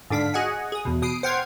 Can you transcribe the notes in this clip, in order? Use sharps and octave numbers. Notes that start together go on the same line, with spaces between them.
G#2 D3 D4 F5 B6
F#4 G#4 D#5 F#5 G#5
G#4 D#6
E2 B2
B2 D#6 C7 D7
C5 F#5 G5 F6 G#6 C7